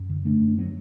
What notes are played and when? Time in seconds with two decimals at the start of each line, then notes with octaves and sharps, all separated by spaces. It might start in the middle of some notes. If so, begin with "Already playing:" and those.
Already playing: F#2
0.09 D3
0.25 D3 A3 D4
0.42 F#2
0.48 D4
0.58 F#3 B3